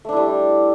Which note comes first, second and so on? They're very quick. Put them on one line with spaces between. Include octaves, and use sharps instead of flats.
A3 D4 E4 G3